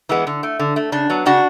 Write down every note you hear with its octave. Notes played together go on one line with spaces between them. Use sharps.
E3 G#3 B3
D3
A3
D3
A3
C#3 D4
F#3 B3
C#3 D4 F#4